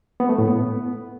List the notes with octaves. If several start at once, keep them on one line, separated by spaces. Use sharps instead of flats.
B3
A3
A2
B3